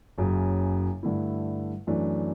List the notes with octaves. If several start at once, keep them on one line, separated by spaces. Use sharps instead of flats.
F#1 F#2 C#3
G2 D3 A3 E4
F#2 E3 A3 D4